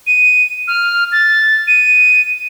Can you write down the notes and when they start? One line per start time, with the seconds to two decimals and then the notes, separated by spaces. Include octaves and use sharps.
0.07 D#7
0.68 F6
1.12 A6
1.67 D#7